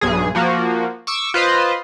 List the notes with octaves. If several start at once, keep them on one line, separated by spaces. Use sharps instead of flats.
B1 G2 G#4
F3 A#3 F#4
C#6 D6 E6
F4 B4 C5 D#5